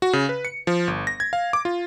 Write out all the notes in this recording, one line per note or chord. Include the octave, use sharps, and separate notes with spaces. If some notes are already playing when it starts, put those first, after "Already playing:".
F#4
C#3
B4
C#7
F3
G1
A#6
G#6
F5
D6
F4